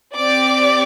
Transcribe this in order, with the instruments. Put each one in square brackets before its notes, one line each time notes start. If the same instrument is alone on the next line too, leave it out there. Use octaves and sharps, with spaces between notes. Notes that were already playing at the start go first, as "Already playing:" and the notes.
[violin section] C4 G4 D5 D6